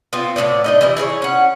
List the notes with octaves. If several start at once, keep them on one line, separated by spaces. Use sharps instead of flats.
B3 C4 F4
A2 E3 B3 D5
D4 D#4 D#5
E3 G3 E4
E4 G#4 C5 C#5
C#4 F#5